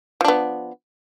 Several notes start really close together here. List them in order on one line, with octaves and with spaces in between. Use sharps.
F3 D4 B3